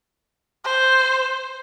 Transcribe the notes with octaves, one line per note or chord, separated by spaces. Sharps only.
C5